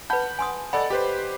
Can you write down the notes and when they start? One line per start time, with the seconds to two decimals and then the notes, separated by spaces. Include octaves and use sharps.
0.10 B4 F#5 A5 B5 G6
0.39 G#5 C6 D#6
0.73 A4 D5 D#5 F#5 B5
0.90 G4 B4 C5